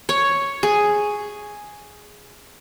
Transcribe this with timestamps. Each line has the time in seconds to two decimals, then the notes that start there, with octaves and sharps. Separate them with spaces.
0.09 C#5
0.63 G#4